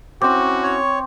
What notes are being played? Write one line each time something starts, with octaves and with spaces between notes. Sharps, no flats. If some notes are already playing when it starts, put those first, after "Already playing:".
C4 C#4 E4 F#4 C#6 D6
C#5